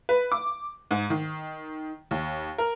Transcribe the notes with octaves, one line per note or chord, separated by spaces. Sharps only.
B4
D6
G#2
D#3
D#2
A#4